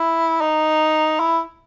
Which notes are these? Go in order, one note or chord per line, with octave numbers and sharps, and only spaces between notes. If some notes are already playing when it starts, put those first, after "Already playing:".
Already playing: E4
D#4
E4